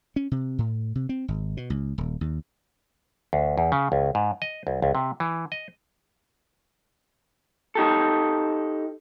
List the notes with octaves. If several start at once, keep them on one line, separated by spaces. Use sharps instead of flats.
C#4
C3
A2
C3
C4
G#1
B2
C#2
D#1
D#2
D2
E2
C#3
C#2
G#2
D#5
C2
C#2
C3
E3
D#5
D#4 G4 A4